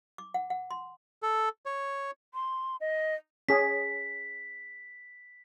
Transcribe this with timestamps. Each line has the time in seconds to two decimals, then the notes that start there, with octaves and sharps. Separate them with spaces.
0.18 D6
0.34 F#5
0.50 F#5
0.71 C6
1.23 A4
1.66 C#5
2.34 C6
2.80 D#5
3.49 C#4 G#4 B6